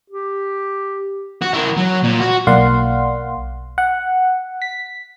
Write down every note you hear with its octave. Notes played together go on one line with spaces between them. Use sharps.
G4
F#4
E4 A#4
F#3
A#2
F#4
B1 A#3 D5 F5 F#5 C6
F#5
B6